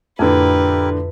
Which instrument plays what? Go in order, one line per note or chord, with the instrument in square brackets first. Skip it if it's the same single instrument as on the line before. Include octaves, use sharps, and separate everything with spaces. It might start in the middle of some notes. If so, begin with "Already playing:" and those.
[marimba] F2 [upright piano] A2 D3 [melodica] E4 G4 A#4 [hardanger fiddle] B4